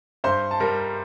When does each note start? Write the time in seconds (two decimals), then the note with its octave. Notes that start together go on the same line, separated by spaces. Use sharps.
0.24 G2 C5 C6
0.51 A5
0.60 G3 A#4 A#5